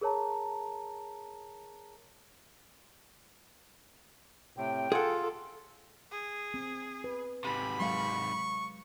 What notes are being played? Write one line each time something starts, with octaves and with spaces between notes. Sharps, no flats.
G#4 A#4 C#5 A5 A#5
A2 C3 G5
F4 G#4 A4 F#5
G#4
C4
B4
G#2 C3 B5
F#3 G#3 F5 C#6